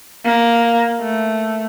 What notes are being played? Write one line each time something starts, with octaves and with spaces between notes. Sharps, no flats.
A#3
A3